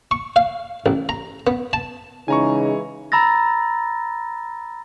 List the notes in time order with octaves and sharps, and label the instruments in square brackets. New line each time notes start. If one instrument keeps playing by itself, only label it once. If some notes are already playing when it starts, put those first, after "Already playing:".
[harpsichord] C#6
F5
A1
A#5
B3
A5
[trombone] C#3 [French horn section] E3 G#3 [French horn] D#4 [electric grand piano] G#5 A#5 C#6
[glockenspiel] A#5 B5 E6 A6 A#6